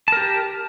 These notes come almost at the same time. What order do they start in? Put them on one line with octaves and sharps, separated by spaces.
A5 A#4 G4